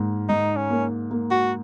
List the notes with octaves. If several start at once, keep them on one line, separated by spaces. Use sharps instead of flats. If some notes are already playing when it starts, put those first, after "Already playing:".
Already playing: G#2 A#3
G#2 D#4
C#4
A#3
A#3
F#4